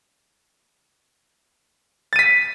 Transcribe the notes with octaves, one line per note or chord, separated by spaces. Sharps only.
A6 B6 D#7